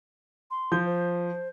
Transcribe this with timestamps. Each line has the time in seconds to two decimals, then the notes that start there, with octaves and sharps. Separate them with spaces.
0.51 C6
0.72 F3 G6
0.86 C5